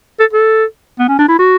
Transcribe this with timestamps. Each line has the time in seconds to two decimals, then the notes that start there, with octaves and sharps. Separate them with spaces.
0.20 A4
0.33 A4
0.99 B3
1.09 C#4
1.19 D4
1.29 E4
1.39 F#4